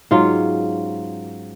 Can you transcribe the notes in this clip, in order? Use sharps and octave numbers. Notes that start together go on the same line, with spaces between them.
G#2 F#3 C#4 F4